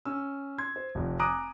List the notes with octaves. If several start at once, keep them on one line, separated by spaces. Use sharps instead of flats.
C#4 E6
C6 G#6
C5
F1 F2
G#5 A#5 D6 D#6 F#6 D7